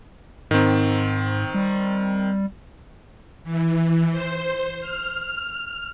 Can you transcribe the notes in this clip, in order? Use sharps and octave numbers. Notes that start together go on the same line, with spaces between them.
G#2 D#3 C4
G3
E3
C5
F6